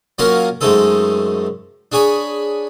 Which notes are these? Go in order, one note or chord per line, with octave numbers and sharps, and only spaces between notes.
F#3 A#3 C#4 F4 A#4 C#5
F#2 G#3 A3 C4 D#4 A4
D4 G#4 C#5 G#5 B5